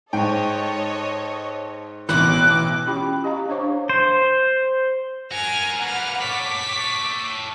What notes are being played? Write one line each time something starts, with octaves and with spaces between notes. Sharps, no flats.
G#2 A4 C#5 D#5 G5
A1 B2 D6 F#6
C#4 E4 F4 G4 G5 B5
G4 D#5 F5 A#5
D4 C5 C#5 F5 C#6 D6
C5
F#4 A#4 G#5 F6
A#3 B4 F#5 F6
A4 C#5 D6 B6